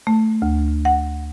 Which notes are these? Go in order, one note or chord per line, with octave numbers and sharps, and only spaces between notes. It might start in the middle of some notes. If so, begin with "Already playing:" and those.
A3
D2
F#5